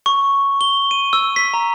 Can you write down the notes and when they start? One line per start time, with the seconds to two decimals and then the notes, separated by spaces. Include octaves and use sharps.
0.06 C#6
0.61 G7
0.91 D#7
1.13 E6
1.36 B6
1.54 A#5